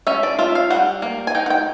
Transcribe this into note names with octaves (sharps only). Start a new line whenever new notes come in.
C#4 E5
D5
F4 E5
F5
G3 F#5
A#3
G#5
D#4 G5
F#5
G5